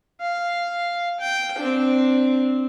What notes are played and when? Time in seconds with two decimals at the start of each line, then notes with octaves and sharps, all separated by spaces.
0.21 F5
1.20 G5
1.58 C4 D4